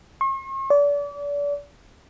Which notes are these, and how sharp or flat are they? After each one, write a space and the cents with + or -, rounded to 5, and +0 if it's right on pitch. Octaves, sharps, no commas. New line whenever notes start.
C#6 -45
D5 -35